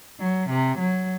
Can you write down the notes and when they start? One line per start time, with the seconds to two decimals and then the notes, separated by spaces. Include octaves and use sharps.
0.20 F#3
0.50 C3
0.78 F#3